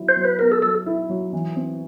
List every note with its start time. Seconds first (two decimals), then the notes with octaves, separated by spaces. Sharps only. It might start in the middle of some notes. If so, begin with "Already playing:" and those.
Already playing: F#3 E4
0.09 C5
0.16 F#3
0.24 B4
0.39 B3 A#4
0.52 A4
0.62 F#3 A4
0.86 E4
1.10 F#3
1.33 E3
1.56 C4